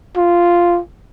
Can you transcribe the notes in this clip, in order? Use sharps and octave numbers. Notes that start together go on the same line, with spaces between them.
F4